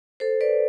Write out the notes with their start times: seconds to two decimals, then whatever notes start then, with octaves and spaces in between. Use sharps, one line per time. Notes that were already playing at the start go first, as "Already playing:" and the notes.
0.20 A4 C5
0.41 B4 D5